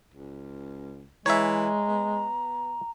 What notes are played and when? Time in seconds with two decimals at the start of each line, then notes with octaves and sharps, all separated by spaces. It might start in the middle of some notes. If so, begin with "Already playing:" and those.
0.14 C#2
1.26 E3 G#3 C#5 E5 A#5
1.88 B3